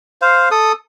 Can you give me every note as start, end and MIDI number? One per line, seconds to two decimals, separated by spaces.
0.22 0.49 72
0.22 0.49 77
0.51 0.72 69
0.51 0.72 87